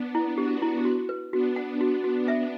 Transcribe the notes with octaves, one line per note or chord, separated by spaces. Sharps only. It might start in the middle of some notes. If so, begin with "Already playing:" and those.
Already playing: B3 D4
E4
D4 F#4 G4
E4
F#4
B4
B3 D4 F#4
F#5
B3 D4 F#4
F#4
B3 D4 E5